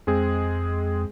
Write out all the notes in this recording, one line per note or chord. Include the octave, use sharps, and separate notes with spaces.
F2 G#3 C4 G#4